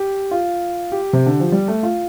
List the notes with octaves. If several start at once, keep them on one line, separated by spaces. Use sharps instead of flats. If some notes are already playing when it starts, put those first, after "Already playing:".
Already playing: G4
F4
G4
C3
D3
F3
G3
A3
F4